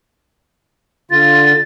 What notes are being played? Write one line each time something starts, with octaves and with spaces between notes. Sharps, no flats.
D3 F4 A6